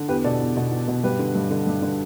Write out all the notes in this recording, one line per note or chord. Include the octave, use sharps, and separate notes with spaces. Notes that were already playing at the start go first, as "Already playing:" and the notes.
Already playing: D3
E2 G4 B4
B2 A4 D5
E2
B2
E2
B2
G2 G4 B4
D3
G2
D3
G2
D3